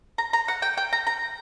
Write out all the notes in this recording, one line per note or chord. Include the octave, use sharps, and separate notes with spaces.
A#5
A#5
F#5
G5
G5
A#5
A#5